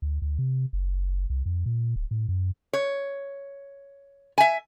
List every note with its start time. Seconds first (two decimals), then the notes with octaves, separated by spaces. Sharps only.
0.02 D2
0.22 D2
0.38 C3
0.73 F#1
1.30 C2
1.46 F2
1.66 A#2
1.96 D1
2.11 A2
2.29 F#2
2.73 C#5
4.38 E5 G#5